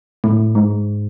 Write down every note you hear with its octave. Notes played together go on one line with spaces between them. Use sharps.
A2
G#2